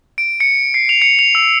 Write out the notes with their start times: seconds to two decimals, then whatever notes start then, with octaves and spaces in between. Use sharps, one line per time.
0.18 D7
0.40 C#7
0.74 C7
0.89 F7
1.02 C#7
1.19 F7
1.35 E6